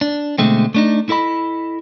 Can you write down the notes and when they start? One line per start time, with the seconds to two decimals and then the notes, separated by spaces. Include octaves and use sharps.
0.01 D4
0.38 B2 D3 G#3 A3 C4
0.75 A3 D4 D#4
1.09 E4 A4 D#5 B5